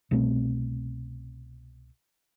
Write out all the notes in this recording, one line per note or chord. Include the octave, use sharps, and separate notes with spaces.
C2 B2 A3 C4